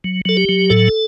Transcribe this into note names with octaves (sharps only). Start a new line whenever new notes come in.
F#3
F#3 A4
G4
F#3
A2 A4